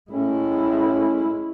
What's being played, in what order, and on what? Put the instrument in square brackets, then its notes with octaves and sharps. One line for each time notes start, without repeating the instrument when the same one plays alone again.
[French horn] A2 [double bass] G#3 E4 [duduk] C#4